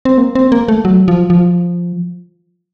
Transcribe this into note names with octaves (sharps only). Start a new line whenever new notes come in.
C4
A#3
C4
A#3
A3
F#3
F3
F3